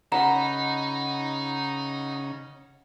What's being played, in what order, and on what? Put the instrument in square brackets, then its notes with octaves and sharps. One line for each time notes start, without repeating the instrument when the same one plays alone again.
[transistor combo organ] C#3 [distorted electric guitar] D#4 [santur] F#5 B5 [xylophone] A#5